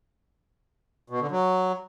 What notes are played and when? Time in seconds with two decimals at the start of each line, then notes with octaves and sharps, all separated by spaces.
1.10 B2
1.20 D3
1.31 F#3